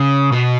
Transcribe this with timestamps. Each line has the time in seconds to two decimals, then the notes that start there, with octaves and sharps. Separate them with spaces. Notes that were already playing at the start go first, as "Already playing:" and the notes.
Already playing: C#3
0.32 B2